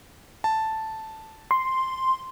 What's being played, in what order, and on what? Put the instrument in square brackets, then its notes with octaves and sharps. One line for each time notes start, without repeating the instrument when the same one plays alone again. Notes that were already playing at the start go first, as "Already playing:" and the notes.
[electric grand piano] A5
[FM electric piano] C6